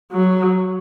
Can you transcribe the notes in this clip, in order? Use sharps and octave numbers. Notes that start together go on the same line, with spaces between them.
F#3